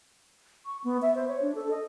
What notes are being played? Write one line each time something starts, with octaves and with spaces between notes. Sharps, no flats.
C#6
B3
E5
C5
C#5
D4
A4
D#5